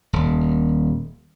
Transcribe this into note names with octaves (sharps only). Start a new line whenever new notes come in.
D#1